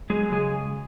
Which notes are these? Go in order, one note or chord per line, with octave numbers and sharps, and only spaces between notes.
F#3 G#3 G#4
C#3 G#3 G#4